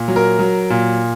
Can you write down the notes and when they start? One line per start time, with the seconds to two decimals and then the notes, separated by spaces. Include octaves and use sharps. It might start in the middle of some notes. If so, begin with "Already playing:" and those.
Already playing: A#2
0.08 F#3
0.16 A#4
0.39 F#3
0.70 A#2